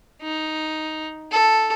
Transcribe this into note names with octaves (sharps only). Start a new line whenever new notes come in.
D#4
A4